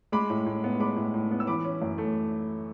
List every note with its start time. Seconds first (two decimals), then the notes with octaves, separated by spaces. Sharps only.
0.12 G#3 B5 D6
0.30 A2
0.46 A2
0.64 B3
0.79 G#3 B5 D6
0.96 A2
1.14 A2
1.31 B3
1.40 E6
1.47 E3 B5 D6
1.65 C#4
1.82 F#2
1.98 A3